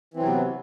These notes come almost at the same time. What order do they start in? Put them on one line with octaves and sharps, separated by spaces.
E3 C4 F#3 C3 B3